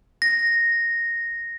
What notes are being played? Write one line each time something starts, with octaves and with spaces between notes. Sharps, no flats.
A#6